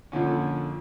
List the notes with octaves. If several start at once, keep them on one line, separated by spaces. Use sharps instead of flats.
F2 A#2 D3 C#4